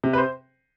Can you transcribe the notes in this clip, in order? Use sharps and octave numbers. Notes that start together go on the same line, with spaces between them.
C3
B4
C5